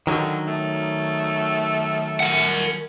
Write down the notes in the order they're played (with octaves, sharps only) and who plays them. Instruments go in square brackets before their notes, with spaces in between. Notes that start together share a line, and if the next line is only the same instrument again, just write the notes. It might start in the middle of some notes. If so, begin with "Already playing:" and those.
[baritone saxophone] D3 [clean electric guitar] D#3 F#3
[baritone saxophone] A3
[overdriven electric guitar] A#4 F#5